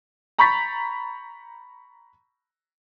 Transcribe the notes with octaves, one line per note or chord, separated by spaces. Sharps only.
A#5 B5 C#6 G6 A6 B6